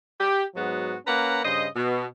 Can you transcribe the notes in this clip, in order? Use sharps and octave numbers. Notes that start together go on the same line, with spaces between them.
G4
G#2 F#3 G#3 B3 F#4
A#3 C#4 B4 F#5 A#5
G2 C#3 C5 D#5
B2